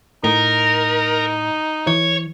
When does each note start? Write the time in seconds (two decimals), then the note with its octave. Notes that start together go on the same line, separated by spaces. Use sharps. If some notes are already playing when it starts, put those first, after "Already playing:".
0.24 A2 D#4 A#4
1.87 E3 C#5